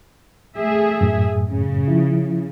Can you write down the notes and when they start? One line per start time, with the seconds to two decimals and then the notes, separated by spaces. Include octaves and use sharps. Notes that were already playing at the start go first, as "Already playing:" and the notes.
0.57 A3 G#4 E5
1.01 F#2 A2
1.49 C#3
1.88 F3 E4